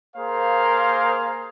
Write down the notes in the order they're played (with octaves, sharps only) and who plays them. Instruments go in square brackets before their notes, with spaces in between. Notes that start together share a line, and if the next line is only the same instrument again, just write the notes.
[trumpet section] A#3 G#4 A#4 C5 F5